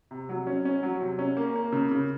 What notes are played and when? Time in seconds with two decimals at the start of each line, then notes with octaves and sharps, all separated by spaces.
0.11 C3
0.29 F#3
0.47 C#4
0.65 C#4
0.83 F#3
1.01 C3
1.19 C#4
1.37 A#3
1.56 A#3
1.72 C#3
1.91 C#3